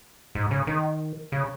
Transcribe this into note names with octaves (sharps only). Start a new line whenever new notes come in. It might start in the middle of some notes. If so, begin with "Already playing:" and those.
G#2
C#3
D#3
C#3